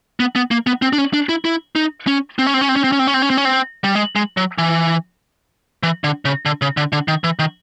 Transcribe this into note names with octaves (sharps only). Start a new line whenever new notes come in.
B3
B3
A#3
B3
C4
D4
C#4
D4
E4
E4
D#4
C#4
C4
C#4
C4
C#4
C4
C#4
C4
C#4
C4
C#4
C4
C#4
C4
C#4
C4
G3
G#3
G#3
F#3
E3
E3
D3
C#3
D3
C#3
D3
D3
D#3
E3
D#3